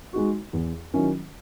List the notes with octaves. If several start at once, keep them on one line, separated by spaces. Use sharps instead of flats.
G#3 D#4 F#4
E2
D#3 F#3 C#4 E4